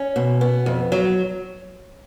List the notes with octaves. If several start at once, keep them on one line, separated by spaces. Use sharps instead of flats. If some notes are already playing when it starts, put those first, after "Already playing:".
Already playing: C#4
B2
B3
F2
F#3